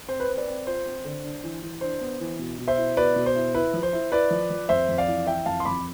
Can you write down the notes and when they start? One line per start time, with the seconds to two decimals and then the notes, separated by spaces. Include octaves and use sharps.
0.08 C4 C5
0.20 B4
0.28 C4 C5
0.37 B4 D5
0.47 C4
0.66 F4 C5
0.86 C4
1.05 D3
1.24 D4
1.44 E3
1.62 E3
1.81 D4 C5
2.00 B3
2.20 E3
2.39 B2
2.59 B2
2.68 C5 E5
2.77 E4
2.97 B2 B4 D5
3.16 B2
3.26 C5
3.35 E4
3.54 E4 B4
3.74 F3
3.83 C5
3.93 E4
4.12 E4 B4 D5
4.31 F3
4.50 F3
4.69 F2 C5 E5
4.88 F2
4.98 D5 F5
5.08 E3
5.27 E3 E5 G5
5.46 F2 F5 A5
5.60 C6
5.65 F2 B5 D6